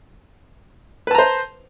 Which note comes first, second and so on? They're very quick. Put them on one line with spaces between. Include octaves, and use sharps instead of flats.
B4 A5 A#5 C5